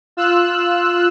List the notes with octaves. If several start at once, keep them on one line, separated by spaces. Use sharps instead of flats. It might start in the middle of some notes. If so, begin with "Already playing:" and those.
F4 E6 F#6